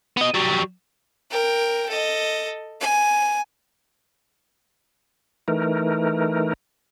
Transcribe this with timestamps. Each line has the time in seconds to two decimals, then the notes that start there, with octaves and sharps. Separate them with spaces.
0.17 B3 D#5
0.34 F#3 G3
1.31 A#4 G5
1.89 A4 D#5
2.80 G#5
5.48 E3 A3 D#4 A#4